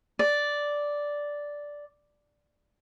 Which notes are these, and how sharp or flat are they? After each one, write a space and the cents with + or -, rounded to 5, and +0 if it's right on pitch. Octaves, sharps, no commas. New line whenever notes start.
D5 -5